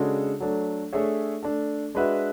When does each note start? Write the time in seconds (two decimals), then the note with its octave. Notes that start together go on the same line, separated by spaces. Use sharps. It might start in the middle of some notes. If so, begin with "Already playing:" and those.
Already playing: C#3 G#3 D4 F#4 A4
0.40 F#3 A3 D4 A4
0.92 A3 D4 G#4 C#5 E5
1.43 A3 D4 A4
1.95 G#3 D4 F#4 B4 E5